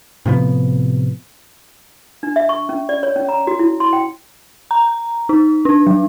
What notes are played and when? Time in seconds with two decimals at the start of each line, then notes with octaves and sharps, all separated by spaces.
0.26 A2 C3 F3 B3
2.23 D4
2.36 E5
2.49 C#6
2.69 C#4
2.89 D5
3.03 C#5
3.16 C#4
3.29 A#5
3.47 F#4
3.59 E4
3.80 C6
3.93 G5
4.71 A#5
5.29 D#4
5.65 D4
5.87 F#3